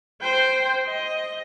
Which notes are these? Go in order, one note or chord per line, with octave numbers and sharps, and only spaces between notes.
C5 G5
D#5